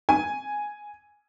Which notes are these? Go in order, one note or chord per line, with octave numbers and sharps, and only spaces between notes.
G#5